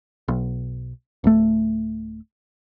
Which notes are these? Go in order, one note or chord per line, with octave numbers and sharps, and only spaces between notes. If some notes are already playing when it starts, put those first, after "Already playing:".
B1
D1 A3